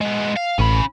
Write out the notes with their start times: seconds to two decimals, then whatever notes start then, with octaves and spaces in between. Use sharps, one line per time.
0.01 G#3 B3
0.37 F5
0.59 A1 C#4 B5